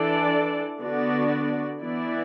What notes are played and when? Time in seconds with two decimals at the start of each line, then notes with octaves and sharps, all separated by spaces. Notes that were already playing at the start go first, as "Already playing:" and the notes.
Already playing: E3 D4 A4 D5
0.80 D3 B3 D4 F#4 D5
1.81 E3 B3 E4 D5